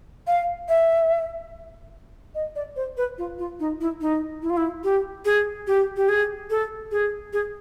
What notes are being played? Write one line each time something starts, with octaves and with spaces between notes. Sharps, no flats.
F5
E5
D#5
D5
C5
B4
F4
F4
D#4
E4
D#4
E4
F4
E4
G4
G#4
G4
G4
G#4
A4
G#4
G#4